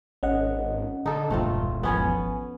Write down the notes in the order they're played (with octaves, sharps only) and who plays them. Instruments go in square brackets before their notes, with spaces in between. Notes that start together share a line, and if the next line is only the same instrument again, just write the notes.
[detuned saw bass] G#1 [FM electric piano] C#4 D#5 F#5
[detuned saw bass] D3 [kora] D#4 A4
[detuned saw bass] E1 [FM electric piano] C#2 G2 A#2 [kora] A3 C4 F4
[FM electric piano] G#1 F3 G#5 [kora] B3 C#4 C#5